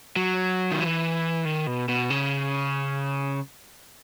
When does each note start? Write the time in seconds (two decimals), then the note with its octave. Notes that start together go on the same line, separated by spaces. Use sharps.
0.16 F#3
0.71 D#3
0.81 E3
1.45 D#3
1.67 B2
1.88 B2
2.10 C#3